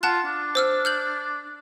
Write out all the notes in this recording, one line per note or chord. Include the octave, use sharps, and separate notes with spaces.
F4 F#5 A5 F#6
D4
C5 E6 F6
F6 G6 F#7